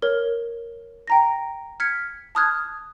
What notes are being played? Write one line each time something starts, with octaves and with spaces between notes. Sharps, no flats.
A#4 C#5
G5 A#5 A#6
F6 G#6 B6 C#7
A5 B5 D#6 F6 F#6 G#6